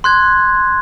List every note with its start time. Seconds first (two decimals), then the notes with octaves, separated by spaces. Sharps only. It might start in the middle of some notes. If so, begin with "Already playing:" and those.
0.04 C6 F#6 G#6